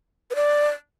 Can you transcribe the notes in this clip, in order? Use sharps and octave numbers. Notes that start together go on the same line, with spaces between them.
B4
D5